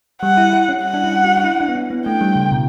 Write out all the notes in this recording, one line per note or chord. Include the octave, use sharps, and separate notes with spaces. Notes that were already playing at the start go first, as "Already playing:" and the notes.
G3 F#5
E4
E4
C#4
F#5
D4
E4
F#4
F#4
E4
D4
B3
C#4
B3
A3 G5
G3
C#3
B2